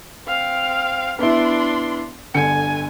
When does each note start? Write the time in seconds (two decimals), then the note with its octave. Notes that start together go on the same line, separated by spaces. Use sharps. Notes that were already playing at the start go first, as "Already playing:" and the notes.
0.26 C4 F5
1.19 B3 D4 E4 C6
2.35 G1 D3 G#5 C#7